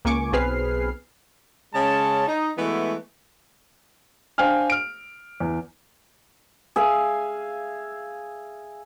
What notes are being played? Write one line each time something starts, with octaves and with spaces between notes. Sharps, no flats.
C#2 A#3 G#5 C#6 D6
B1 C4 G#4 B4 F6 C7
C#3 G#3 C#4 C#5 A5
D#4
E3 G#3 A3 B3 E4 F#4
D4 C5 F5 G5 G#5 F6
F6 D7
E2
G#4 E5 F5